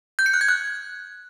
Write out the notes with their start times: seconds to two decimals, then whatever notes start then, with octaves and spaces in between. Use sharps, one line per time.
0.19 G6
0.26 C#7
0.34 F#6
0.41 G#6
0.48 F#6